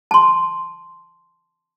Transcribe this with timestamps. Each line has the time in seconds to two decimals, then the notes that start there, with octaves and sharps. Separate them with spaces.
0.11 A5 C6